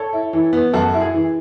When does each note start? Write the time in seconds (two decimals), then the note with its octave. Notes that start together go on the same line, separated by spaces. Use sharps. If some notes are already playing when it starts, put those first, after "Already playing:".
Already playing: A4 C#5
0.13 E4
0.33 E3
0.53 B3
0.73 F#2 F#4 A4
0.94 E4
1.01 G#4
1.14 E3